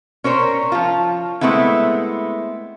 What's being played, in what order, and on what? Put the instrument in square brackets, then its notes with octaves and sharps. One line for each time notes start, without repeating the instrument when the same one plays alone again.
[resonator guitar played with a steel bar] C#4 A#4 C5 C#5
F3 F4
G#3 A3 B3 C4 E4